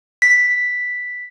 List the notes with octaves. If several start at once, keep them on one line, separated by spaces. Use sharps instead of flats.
B6